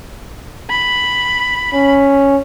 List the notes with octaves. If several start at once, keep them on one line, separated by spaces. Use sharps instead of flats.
B5
C#4